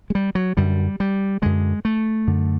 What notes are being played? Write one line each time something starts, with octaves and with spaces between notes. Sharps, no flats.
G#3
G3
F#3
F#2 D3 G3
G3
F#2 D3 G#3
A3
F#2 D3